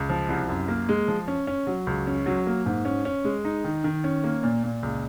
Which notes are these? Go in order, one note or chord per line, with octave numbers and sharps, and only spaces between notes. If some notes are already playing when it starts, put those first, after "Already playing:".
Already playing: C#2
F3
C2
F#2
A#3
G#3
F3
C#4
C#4
F#3
C#2
C#4
F#3
A#3
G#2
C#4
C#4
G#3
D#4
D#3
D#3
C#4
A#3
A#2
A#2
C#2